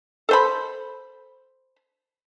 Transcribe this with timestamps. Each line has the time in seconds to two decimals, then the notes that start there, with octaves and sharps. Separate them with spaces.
0.29 A4 C5 B5